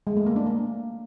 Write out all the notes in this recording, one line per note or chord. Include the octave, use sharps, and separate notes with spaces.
G#3
A3
A#3
D4
A#3